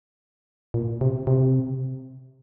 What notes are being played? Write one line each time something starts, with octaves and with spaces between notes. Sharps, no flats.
A#2
C3
C3